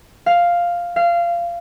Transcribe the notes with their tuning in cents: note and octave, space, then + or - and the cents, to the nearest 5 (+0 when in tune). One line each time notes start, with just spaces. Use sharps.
F5 +0
F5 -20